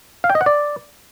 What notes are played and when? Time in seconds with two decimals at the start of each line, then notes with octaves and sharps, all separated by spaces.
0.24 F5
0.30 G5
0.35 D#5
0.41 F#5
0.46 D5